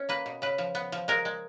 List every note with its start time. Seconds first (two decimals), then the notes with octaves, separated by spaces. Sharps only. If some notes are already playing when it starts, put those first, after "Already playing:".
Already playing: C#4
0.09 A#3 B4
0.26 B2
0.42 C#3 B4
0.58 F3
0.75 B3
0.92 F3
1.08 G#3 A#4
1.25 G#3